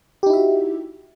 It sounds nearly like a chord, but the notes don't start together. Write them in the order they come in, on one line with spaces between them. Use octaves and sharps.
G4 D#4 E4 E5 F#4